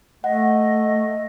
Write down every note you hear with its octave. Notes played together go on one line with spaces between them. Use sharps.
A3 D#5 F#5